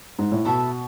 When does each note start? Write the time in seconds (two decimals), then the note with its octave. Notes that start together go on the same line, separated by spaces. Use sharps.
0.19 G#2
0.32 A2
0.45 B2 E4 A4 E5 A5